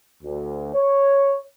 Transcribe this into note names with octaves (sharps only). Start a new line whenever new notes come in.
D2
C#5